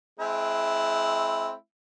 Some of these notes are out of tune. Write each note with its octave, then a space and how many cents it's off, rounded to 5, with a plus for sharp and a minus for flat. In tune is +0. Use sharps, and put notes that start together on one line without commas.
G#3 +30 C4 +0 E4 +0